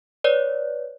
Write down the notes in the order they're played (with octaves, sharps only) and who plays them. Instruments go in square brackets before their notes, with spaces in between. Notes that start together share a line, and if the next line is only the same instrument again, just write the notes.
[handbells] B4 C#5 D5